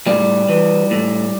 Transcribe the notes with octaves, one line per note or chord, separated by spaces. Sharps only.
A2 G3
E3
A2